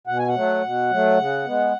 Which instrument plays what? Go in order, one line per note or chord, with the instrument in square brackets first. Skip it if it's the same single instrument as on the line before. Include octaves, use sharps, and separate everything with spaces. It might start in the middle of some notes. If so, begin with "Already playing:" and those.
[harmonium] B2 F#5
G#5
F#5
F#3 A3
B2
F#3 A3
C#3
G#3 B3